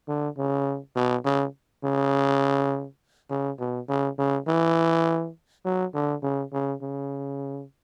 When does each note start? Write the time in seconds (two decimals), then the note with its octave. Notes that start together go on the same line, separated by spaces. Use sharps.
0.08 D3
0.38 C#3
0.96 B2
1.25 C#3
1.84 C#3
3.30 C#3
3.60 B2
3.89 C#3
4.19 C#3
4.47 E3
5.65 F#3
5.94 D3
6.23 C#3
6.53 C#3
6.82 C#3